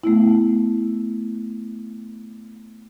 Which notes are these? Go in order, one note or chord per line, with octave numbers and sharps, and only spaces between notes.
A3 B3 E4